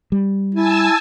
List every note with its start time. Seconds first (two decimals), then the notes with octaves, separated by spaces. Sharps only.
0.12 G3
0.55 E4 G#5 A5 E6